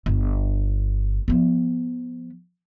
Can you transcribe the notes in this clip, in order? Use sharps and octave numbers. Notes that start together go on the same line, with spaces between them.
G1
F3 B3